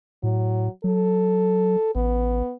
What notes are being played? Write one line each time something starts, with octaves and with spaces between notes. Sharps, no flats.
A2 F#3
F#3 A4
A1 B3